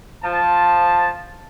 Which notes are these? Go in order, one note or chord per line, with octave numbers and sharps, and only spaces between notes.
F3 A5